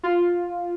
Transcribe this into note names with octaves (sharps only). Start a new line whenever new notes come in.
F4